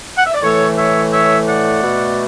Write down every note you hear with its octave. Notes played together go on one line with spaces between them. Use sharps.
F#5
E5
D5
A2 E3 A3 A4 C#5
C#5 E5
C#5 E5
D5 F#5
B2 A3